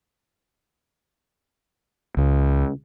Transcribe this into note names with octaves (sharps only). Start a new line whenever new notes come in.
C#2